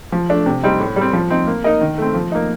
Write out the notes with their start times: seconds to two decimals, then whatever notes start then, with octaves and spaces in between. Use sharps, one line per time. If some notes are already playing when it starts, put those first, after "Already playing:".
0.12 F3
0.29 A3 D4
0.46 C3
0.63 G3 C4 D#4
0.80 A2
0.96 G3
1.01 C4
1.13 F3
1.30 C4 D#4
1.47 A#3
1.64 D#4 A#4 D#5
1.81 D#3
1.98 A3 C4
2.14 F3
2.32 A#3 D#4